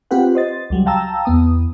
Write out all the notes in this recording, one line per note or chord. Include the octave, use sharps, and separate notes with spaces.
C4 F4 G4 B4 F#5
C5 D#5 A6
C#2 F#3 G3
F5 G5 A5 A#5 E6
E2 B3 D#6